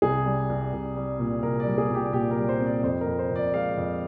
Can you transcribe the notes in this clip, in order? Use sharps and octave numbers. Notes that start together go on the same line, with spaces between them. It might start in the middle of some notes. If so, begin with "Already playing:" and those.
C2 G#4
G3
C2
C2
G3
A#2
C2 A#4
D5
G3
G#4
A#2 G4
A#2 G4
A#4
G3
C5
C4
D5
F2 C5
F2 A#4
C5
F2
D5
G#3 F5
F2